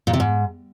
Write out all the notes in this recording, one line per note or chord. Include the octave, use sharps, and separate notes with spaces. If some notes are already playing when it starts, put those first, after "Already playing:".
A#2
C3
G#2